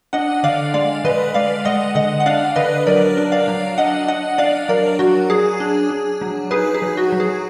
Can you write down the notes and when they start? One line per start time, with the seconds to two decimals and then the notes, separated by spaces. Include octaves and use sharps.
0.13 D4 D#5 F#5
0.43 D3 D5 F5
0.74 G#3 D5 F5
1.04 D3 B4 D#5
1.34 G#3 D5 F5
1.65 G#3 D#5 F#5
1.95 D3 D#5 F#5
2.20 F#5
2.26 D4 D5 F5
2.56 D3 B4 D#5
2.87 F#3 A#4 D5
3.17 D4
3.32 D5 F5
3.48 F#3
3.78 D4 D#5 F#5
4.08 D4 D#5 F#5
4.38 D4 D5 F5
4.69 F#3 A#4 D5
4.99 F#3 F#4
5.30 F#3 G#4
5.60 D4
5.90 D4
6.21 F#3
6.51 D#4 G#4 B4
6.74 G#4
6.82 F#3
6.97 F#4
7.12 F#3
7.20 G#4